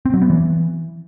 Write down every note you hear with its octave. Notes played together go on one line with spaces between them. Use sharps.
C4
F#3
B3
E3